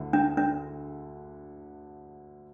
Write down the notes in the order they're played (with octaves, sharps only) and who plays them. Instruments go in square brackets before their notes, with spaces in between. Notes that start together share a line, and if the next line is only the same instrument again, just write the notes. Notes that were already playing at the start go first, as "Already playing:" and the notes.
Already playing: [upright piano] D2 D3 E4
[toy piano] D4
D4